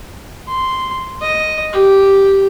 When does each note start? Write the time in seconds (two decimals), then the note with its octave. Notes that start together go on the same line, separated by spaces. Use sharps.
0.48 C6
1.21 D#5
1.73 G4